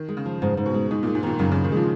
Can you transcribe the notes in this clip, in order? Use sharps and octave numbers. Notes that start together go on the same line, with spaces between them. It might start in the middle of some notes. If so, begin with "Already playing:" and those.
Already playing: D#3
G#3
C#3
F3
G#2 C#3
G#2
B2
G#3
G#2 D#4
A#2
G#3
G#2
A#2 D#3
F#2 C#3
C#3
D#4
D#3
F3 G#3